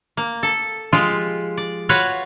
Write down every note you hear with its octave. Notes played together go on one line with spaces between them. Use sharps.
A#3
A4
F3 G#3 F4 G4
D5
F4 F#4 B4 C#5 F5